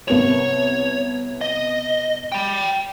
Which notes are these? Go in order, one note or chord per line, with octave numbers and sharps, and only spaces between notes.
C2 B3 C#5 F7
D#5
G5 B5